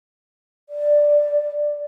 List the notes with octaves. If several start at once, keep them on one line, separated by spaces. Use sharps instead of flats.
D5